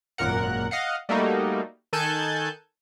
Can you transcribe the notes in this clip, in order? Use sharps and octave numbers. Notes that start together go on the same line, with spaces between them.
G#1 F#2 A#2 A#4 F#5
D#5 F5 F#5
G3 A3 A#3 D#4 F#4
D#3 A4 G#5 A5 F#6 G6